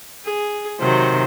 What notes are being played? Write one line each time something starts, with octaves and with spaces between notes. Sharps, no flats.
G#4
C3 D#3 F#3 C5